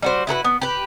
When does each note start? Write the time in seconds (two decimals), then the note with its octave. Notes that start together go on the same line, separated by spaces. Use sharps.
0.02 G3 F#4 C5
0.27 E4 F#4 A4 B4
0.44 B3
0.61 G4 B4